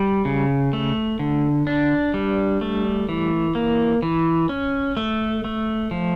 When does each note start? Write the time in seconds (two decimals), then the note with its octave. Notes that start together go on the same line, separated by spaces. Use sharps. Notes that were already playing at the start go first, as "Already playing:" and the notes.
Already playing: G3
0.25 C#3
0.73 A3
1.19 D3
1.67 D4
2.14 G3
2.61 A3
3.09 E3
3.55 A#3
4.02 E3
4.49 C#4
4.97 A3
5.44 A3
5.91 F3